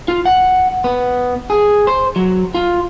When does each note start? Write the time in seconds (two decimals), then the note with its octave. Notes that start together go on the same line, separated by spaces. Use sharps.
0.08 F4
0.26 F#5
0.84 B3
1.50 G#4
1.87 C5
2.16 F#3
2.55 F4